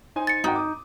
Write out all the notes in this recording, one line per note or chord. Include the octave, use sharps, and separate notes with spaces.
D#4 C5 G#5
A6 C#7
G#1 D#4 F#4 G5
D6 D#6